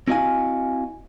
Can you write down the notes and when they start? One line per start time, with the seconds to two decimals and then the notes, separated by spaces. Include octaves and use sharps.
0.08 C4 E4 F#4 D#5 F5 G#5